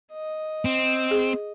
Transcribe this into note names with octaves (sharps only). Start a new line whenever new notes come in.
D#5
C4
G#4